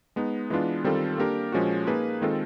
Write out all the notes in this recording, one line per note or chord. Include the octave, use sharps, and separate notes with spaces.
G#3 B3 D#4
E3 G#3 B3 D4 F4
D#3 G3 C4 F4 A4
A#3 D4 G4 A#4
A#2 F3 G#3 C#4 F#4
A#3 D#4 G#4 B4
D#3 G#3 C4 F4 A4